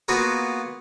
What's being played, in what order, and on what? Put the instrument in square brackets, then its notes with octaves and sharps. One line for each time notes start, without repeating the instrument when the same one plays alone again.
[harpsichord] A#3 B3 F4 F#4 G#4 A#4